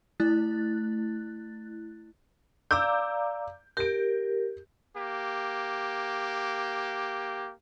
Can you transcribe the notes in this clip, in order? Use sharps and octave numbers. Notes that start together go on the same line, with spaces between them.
A3 E4 F#6 A6
D5 F5 A#5 D6 E6 G6
G4 A#4 G6 D7
A#3 G4